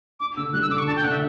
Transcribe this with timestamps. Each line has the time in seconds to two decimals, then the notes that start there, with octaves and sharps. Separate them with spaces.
0.20 D4 D6
0.37 D3 E6
0.53 G3 F#6
0.62 E6
0.70 D3 D6
0.78 C#6
0.87 D4 A5
0.96 G5
1.04 D3 F#5
1.12 E5